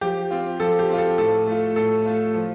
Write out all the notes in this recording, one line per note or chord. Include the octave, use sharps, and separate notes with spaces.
F3 G4
C4 F4
F3 A4
G4
C4 F4
A4
A2 A4
A3 F4
A2 A4
A3 F4
F3